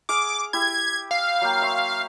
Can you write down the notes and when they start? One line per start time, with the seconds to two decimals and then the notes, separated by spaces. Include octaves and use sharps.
0.09 G#4 F5 D6 D#6
0.53 E4 G4 G#6
1.11 F5
1.41 F#3 A#3 G5
1.62 E5 C6 C#6